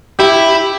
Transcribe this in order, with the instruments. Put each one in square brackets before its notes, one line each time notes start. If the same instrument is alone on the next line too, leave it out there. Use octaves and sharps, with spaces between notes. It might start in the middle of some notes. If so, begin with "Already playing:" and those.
[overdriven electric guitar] E4 [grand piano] G4